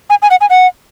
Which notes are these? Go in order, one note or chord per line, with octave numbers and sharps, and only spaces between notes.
G#5
G#5
F#5
G#5
F#5